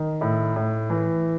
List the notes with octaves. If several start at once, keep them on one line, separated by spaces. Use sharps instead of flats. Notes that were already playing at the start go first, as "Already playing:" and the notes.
Already playing: D#3
A2 E5
A2
E3